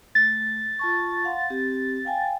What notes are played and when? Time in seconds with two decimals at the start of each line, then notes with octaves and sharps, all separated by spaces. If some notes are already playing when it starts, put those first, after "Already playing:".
0.15 A3 A6
0.79 F4 A5 C#6
1.24 F5 F#5 C6
1.50 C4 G4
2.05 F5 G5 G#5